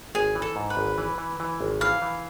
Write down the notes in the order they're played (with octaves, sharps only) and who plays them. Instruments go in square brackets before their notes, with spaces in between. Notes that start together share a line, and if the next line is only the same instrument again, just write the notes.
[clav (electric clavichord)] G#1 [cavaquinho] G#4
[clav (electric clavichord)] E3
[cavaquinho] A4
[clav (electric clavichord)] G#2
[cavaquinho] B4
[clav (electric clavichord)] G#1
E3
E3
E3
G#1
[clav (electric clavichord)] E3 [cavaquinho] F5
[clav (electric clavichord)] E3